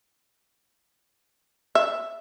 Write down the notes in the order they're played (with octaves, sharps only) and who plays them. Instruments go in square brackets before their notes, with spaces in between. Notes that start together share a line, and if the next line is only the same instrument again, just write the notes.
[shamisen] E5